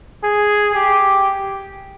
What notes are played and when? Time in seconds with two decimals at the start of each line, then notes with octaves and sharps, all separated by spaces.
0.24 G#4
0.75 G4